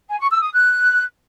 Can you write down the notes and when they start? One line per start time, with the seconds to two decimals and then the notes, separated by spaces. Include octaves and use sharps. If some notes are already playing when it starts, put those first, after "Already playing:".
0.08 G#5
0.19 C#6
0.31 E6
0.42 D#6
0.53 F#6